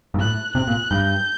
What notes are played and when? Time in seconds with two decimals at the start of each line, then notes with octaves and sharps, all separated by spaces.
0.14 G2
0.18 A2 F#6
0.55 C3 F#6
0.67 A#2
0.91 G2 G6